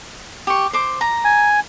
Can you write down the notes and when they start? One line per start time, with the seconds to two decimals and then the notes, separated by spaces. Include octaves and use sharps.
0.47 G4 C#6
0.73 C5 D6
1.01 A#5
1.24 G#5